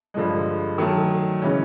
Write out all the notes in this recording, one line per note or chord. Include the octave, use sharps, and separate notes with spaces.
G2 D3 F3 G#3
D#3 F#3 A3
C#3 E3 G#3 C#4